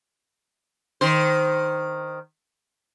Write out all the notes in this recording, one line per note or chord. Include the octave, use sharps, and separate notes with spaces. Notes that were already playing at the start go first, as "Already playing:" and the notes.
D#3 C5